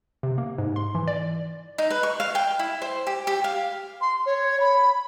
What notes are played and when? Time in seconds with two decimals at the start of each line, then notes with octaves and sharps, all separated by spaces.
0.23 C3
0.38 A#3
0.58 G#2
0.76 C6
0.95 E3
1.08 D5
1.78 D#4
1.90 B4
2.03 C#6
2.20 F5
2.35 G5
2.59 E4
2.82 C5
3.07 G4
3.27 G4
3.44 F5
4.01 C6
4.26 C#5
4.60 B5